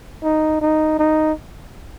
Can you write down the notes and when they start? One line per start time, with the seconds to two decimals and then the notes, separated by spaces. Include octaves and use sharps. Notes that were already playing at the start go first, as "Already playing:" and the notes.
0.24 D#4
0.61 D#4
0.99 D#4